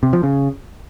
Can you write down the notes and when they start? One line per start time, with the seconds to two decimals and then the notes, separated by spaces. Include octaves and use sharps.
0.03 C3
0.13 F3
0.23 C#3